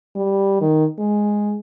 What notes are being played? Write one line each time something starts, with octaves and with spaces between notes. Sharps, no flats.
G3
D#3
G#3